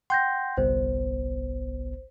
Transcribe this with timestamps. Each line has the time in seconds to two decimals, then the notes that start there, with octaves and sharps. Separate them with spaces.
0.10 F#5 G5 C6 G6 A#6
0.57 G1 C2 B3 C5